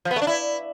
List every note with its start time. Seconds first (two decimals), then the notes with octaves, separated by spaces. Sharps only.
0.05 F3
0.11 B3
0.16 A3
0.22 D4
0.27 E4